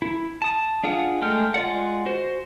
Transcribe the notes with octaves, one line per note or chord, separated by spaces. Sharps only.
E4
A5 D#6
D4 F4 G#4 F#5
G#3 A3 G5 F6
G#3 F4 D5 F#5
F#4 C5